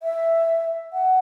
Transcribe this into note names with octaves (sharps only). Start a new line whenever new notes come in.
E5
F#5